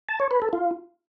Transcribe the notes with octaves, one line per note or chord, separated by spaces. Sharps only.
A5
C#5
B4
A4
F4